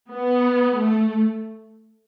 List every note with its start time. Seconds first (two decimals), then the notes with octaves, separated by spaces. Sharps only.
0.11 B3
0.77 A3